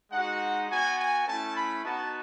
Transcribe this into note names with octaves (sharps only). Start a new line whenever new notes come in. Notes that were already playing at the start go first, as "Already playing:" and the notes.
G#3 D#4 F#4 F#5
B3 F#4 G#5
G#5
A3 C#4 E4 A5
B5
B3 D#4 F#4 A5